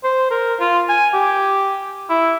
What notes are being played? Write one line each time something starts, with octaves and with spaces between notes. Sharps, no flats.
C5
A#4
F4
G#5
G4
E4